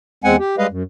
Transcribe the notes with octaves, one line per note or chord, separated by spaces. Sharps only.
E2 G#3 C4 F#5 G#5
G4
G3 G#3 B4 D#5 F5
F#2